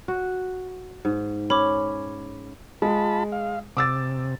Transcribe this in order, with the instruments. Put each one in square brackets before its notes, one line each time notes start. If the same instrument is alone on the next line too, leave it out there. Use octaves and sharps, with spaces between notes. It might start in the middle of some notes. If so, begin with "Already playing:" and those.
[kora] F#4
G#2
[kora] C#4 [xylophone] B5 D6
[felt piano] G#3 [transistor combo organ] F4 A5 B5
[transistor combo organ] F5
[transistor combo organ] C3 [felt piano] D6 E6 A6